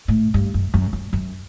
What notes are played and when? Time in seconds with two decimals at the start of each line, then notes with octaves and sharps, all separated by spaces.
0.08 A2
0.34 G2
0.54 F#2
0.74 F#2
0.93 F#2
1.13 F#2